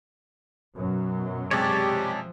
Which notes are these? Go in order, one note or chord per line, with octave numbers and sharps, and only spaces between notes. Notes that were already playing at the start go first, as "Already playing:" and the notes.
F#2 B2 F#3
C3 G#3 G4 C#5 D5 A5
F3